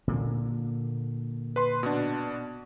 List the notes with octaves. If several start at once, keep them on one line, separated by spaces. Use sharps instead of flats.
A#2 D3 A#3
B4 C6
B2 D4